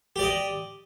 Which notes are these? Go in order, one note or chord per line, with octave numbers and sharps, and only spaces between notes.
G4 D5 D#5